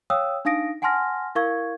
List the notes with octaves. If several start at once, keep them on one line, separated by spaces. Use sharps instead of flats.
C#5 F5 G5 D#6 E6
D4 D#4 F5 D#6 A#6 D7
F#5 G#5 A5 C6 F6 A#6
E4 A#4 F5 C#6 G#6